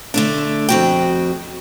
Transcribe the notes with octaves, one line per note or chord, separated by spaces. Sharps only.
D3 A3 D4
F2 F#4 G5